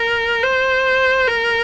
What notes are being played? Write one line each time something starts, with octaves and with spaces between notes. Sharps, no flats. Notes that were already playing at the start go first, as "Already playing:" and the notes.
Already playing: A#4
C5
A#4